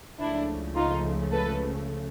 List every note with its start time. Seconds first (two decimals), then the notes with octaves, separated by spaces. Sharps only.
0.20 C#2 C#3 F3 A3 D4 E4
0.76 D#4 F4
1.31 A4 B4